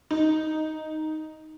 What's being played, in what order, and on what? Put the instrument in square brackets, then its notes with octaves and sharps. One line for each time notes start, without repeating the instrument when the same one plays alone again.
[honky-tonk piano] D#4